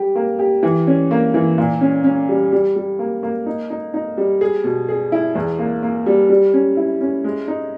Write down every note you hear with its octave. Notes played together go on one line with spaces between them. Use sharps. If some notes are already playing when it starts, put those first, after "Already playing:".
Already playing: G3 G4
A#3
G4
E3
C#4
A#3
E3
A#2
C#4
C#4
G3
G3
G3
A#3
A#3
D#4
D#4
D#4
G3
G#4
B2
G#4
E4
E2
A#3
A#3
G3
G3
C#4
E4
C#4
G#3
D#4